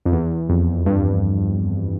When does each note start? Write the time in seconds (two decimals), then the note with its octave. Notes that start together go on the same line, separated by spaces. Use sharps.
0.05 F2
0.12 E2
0.49 F2
0.86 G2